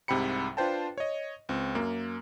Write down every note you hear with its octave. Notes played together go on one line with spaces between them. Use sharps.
C2 G#2 C3 G5 B5 C#7
D4 F4 B4 C5 G5 A5
C#5 D#5
C#2 C4
F#2 A#3